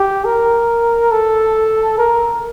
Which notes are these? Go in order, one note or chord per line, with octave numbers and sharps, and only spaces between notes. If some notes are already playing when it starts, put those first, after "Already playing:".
Already playing: G4
A#4
A4
A#4